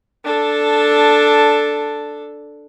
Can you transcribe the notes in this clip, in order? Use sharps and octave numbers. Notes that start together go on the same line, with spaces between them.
D4 A4